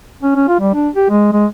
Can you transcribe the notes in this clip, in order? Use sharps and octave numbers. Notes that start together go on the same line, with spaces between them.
C#4
C#4
F4
G3
D4
G4
G#3
G#3